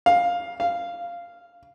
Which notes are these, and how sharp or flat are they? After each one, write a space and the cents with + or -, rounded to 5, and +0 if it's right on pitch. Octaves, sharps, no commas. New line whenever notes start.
F5 +10
F5 -10